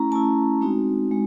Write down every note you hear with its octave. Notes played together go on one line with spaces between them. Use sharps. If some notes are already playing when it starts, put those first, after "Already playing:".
Already playing: A3 C#4 E4 A#5
A3 C#4 E4 A5
G#3 C4 D#4 F#4
G#3